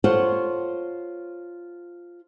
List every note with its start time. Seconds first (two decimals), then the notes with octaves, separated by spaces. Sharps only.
0.04 F4 A4 C5 C#5 F5 F#5